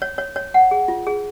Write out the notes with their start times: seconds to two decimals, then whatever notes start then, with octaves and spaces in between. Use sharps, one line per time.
0.02 C#5
0.18 C#5
0.36 C#5
0.54 F#5
0.71 G#4
0.88 F4
1.07 G#4